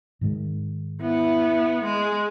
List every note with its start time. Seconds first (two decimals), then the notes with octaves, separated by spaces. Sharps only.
0.21 G#2 D#3 G#3
1.01 B3 E4
1.84 G#3